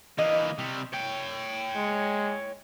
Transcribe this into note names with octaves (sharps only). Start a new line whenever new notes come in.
E3 A#3 D#5
C3 G3
C#5 G5
G#3